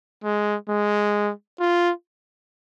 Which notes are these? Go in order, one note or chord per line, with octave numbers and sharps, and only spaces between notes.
G#3
G#3
F4